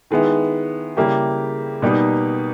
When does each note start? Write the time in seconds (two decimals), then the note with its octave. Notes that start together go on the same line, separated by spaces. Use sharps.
0.11 D#3 G#3 B3 E4
0.97 C#3 G3 A#3 E4 G4
1.82 B2 G3 A#3 D#4